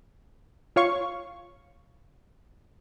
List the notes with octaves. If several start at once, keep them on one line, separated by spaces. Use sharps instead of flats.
F4 C#5 F5 C#6